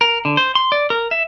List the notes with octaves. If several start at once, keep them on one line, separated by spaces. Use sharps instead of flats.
A#4
D3
C5
C6
D5
A#4
E5